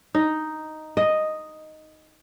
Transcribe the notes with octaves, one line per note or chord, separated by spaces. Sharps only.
D#4
D#5